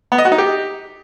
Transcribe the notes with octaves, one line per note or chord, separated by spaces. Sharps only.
B3
D#5
F#4
D#4
G4